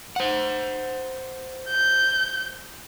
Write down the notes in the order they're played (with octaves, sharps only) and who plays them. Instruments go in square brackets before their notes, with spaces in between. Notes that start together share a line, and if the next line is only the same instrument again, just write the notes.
[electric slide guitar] C5 F#5
[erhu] G6